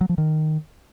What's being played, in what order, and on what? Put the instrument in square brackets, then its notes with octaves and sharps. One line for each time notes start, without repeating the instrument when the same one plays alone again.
[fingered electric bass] F#3
F3
D#3